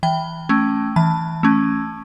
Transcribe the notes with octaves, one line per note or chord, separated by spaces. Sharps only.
E3 G5
A3 C#4
E3 A5
A3 C#4